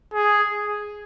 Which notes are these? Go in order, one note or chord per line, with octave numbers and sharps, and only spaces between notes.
G#4